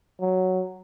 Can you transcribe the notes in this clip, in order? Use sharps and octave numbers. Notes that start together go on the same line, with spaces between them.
F#3